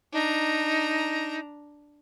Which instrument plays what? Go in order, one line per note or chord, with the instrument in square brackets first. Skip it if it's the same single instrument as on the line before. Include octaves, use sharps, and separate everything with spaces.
[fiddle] D4 A#5 [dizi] D#4